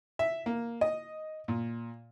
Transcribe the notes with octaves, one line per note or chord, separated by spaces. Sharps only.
E5
A#3
D#5
A#2